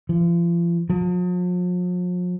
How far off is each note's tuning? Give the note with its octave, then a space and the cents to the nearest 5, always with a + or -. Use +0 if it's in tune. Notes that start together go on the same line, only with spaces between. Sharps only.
F3 -35
F3 +45